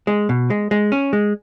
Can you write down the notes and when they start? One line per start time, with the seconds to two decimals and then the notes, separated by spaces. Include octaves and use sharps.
0.07 G#3
0.29 B2
0.50 G#3
0.71 G#3
0.92 C#4
1.13 G#3